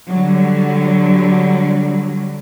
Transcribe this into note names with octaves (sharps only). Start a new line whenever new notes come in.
D3 F#3 G3